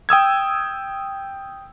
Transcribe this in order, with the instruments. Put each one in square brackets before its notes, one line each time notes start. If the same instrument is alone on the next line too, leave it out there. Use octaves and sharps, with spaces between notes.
[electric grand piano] G5 D#6 E6 G#6